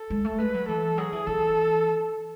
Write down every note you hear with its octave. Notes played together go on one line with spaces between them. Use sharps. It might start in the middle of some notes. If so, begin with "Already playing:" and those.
Already playing: A4
G#3
A3
G#3 B4
F#3
E3 A4
F#3 G#4
E3
E3 A4